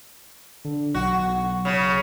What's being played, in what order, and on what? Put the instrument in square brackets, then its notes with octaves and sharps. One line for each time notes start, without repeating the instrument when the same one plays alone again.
[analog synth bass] D3
[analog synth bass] B1 [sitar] F#4
[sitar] C#3